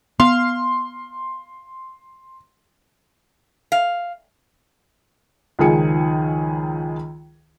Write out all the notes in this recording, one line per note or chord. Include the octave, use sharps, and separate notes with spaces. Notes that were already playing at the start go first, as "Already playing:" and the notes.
B3 F5 C6
F5
C#2 D#3 F3 G#4 C#7